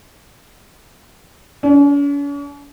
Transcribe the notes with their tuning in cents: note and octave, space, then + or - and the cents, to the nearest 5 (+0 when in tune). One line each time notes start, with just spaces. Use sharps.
C#4 +45